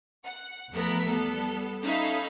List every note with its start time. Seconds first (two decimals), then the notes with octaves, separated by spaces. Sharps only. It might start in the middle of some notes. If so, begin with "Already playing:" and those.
0.23 F#5
0.71 E2 F3 A3 B3 A#4 B6
1.06 G3 B3 A4
1.82 C#4 D#4 A4 E5 F5 B5